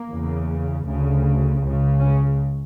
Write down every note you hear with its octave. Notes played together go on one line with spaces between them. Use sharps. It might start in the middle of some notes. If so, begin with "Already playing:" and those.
Already playing: A#3
E2 C#3
D2 C#3
C#2 C#3
C#4